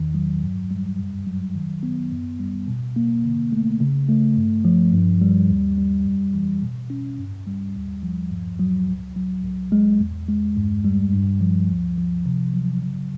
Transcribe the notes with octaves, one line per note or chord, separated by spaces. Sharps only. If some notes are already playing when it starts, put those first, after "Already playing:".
Already playing: E2 D#3
F#3
G2
G3
F#2
F#3
D#3
B3
F#2
G3
B2
A#3
D3
A3
C#3
A3
G2
F3
G2
G3
D#2
G3
F2
E3
B2
C#4
G2
G3
D#2
F3
G2
F#3
C#2
F#3
C2
G#3
E2
G#3
G2
G3
G2
F3
D2
F3
C3
F#3
C#3